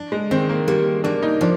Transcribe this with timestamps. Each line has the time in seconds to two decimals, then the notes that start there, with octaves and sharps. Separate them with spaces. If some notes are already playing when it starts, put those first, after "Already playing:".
Already playing: D4
0.12 G#3
0.31 D#3 C4
0.49 A#3
0.68 G3 A#3
1.04 A#3 D4
1.23 D#4
1.41 F3 D4